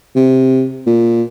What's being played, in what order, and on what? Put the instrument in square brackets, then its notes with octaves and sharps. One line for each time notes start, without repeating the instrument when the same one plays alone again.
[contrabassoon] C3
A#2